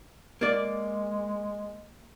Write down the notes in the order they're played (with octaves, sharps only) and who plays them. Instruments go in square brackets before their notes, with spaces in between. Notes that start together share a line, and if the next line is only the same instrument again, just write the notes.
[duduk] G#3 [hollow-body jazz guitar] A#3 D5